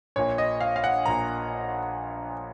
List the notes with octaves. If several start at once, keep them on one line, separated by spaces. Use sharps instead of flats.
A#1 A#2 C#5
D#5
F5
F5
F#5
A#1 A#2 A#5